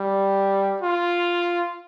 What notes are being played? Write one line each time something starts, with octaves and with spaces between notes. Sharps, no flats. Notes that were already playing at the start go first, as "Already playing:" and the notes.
Already playing: G3
F4